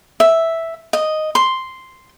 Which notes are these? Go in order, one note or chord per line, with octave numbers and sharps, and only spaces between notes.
E5
D#5
C6